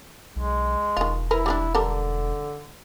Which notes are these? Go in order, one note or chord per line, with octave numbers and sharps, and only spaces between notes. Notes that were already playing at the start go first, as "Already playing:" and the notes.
B1 G#3
E1 D#3 F4
E4 A#4 B4
G3 A#3 D4
D3 G3 A4 A#4